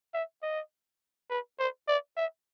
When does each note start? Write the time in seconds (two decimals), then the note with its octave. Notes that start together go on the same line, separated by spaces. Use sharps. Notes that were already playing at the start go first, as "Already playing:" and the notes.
0.14 E5
0.42 D#5
1.30 B4
1.59 C5
1.88 D5
2.17 E5